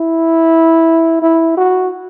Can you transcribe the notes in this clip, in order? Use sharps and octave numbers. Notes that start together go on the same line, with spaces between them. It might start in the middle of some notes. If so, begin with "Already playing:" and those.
Already playing: E4
E4
F#4